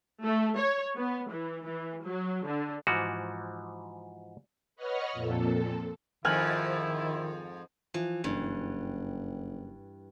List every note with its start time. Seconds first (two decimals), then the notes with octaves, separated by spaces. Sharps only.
0.24 A3
0.57 C#5
0.97 B3
1.30 E3
1.65 E3
2.05 F#3
2.46 D3
2.87 G#2 E3 F3 F#4
4.76 B4 C#5 D#5 F#5 C#6 F6
5.13 F2 A#2 A4
6.25 F2 G#2 D#3 F3 E4 G#5 F6 F#6
7.94 E3 F3
8.24 F#1 G2